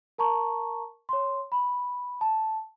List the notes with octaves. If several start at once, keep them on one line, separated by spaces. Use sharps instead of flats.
A#4 A5 A#5 C#6
C#5 C6
B5
A5